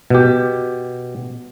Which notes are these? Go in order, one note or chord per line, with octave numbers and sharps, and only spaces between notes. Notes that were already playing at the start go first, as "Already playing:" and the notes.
B2 G4